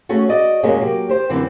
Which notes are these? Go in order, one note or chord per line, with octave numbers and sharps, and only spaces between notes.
A3 C#4 F#4 G#4
F#4 D5 D#5
F#2 C3 F#3 G#3 A#3 C#4
F#3 A#3 G4
G4 C5
F#2 D3 E3 C4